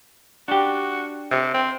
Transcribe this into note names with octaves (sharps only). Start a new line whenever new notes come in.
D4 F#4 G4
C3
C4